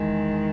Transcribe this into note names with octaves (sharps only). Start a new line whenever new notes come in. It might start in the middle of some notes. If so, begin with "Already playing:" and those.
Already playing: E2 D#3 G#3